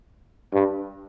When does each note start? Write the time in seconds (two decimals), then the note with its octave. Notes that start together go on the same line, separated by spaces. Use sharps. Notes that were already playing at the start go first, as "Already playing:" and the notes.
0.54 G2